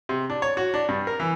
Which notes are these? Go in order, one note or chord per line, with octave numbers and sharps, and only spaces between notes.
C3
D4
C#5
F#4
D4
G2
A#4
E3